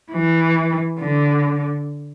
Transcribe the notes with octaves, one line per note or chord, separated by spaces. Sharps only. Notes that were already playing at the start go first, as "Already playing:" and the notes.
E3
D3